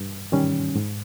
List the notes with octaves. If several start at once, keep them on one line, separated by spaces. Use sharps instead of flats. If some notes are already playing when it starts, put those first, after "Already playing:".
Already playing: G2
D#3 G3 C#4
G#2